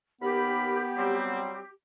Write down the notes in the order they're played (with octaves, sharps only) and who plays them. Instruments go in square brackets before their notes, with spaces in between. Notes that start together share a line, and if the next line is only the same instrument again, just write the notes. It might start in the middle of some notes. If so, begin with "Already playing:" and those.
[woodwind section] D#2 A#4 B5 [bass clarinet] B3 [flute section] G4
[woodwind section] F#3 G3 C4